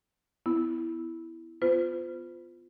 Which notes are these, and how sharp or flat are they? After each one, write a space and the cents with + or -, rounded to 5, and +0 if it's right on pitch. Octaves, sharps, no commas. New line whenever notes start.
B3 +15 E4 +0
B3 +15 F4 +0 C5 -35